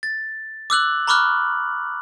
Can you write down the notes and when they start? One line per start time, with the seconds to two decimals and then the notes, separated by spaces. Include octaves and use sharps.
0.03 A6
0.70 D6 E6 F#6 F#7
1.07 A#5 B5 C#6 D6 F6 F#6